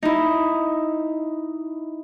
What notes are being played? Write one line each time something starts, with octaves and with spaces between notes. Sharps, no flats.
D#4 E4